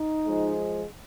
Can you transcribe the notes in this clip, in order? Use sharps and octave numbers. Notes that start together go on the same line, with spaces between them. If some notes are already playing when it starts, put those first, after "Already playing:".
Already playing: D#4
F3 G#3